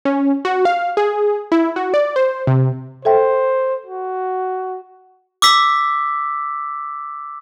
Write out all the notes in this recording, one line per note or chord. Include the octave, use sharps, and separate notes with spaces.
C#4
F#4
F5
G#4
E4
F#4
D5
C5
C3
A4 C5 E5 G5
F#4
D6 E6 B6